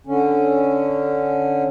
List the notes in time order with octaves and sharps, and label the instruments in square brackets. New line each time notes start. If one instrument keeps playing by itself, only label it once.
[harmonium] D3 C#4